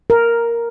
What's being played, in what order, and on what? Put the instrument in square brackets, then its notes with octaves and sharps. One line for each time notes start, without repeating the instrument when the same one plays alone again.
[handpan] A#4